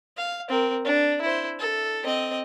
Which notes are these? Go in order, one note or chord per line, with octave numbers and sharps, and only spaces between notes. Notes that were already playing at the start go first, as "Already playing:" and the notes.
F5
C4 A#4
D4
E4 C5
A4
C4 D#5